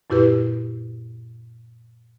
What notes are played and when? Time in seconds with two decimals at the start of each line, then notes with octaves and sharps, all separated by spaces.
0.10 F#2 A#2 E4 G4 B4